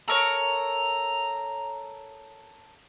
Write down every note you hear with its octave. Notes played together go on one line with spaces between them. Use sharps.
A4 A#4 C#5 A#5